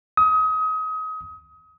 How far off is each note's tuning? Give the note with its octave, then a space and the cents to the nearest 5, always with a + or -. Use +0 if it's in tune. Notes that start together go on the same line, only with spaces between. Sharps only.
D#6 +30